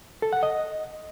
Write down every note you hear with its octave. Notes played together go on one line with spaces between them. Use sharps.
A4
F#5
D#5